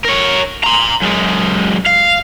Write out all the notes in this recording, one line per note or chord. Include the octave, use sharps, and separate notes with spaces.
A#4 C#5
A#5 C6
F#2 G#3
F5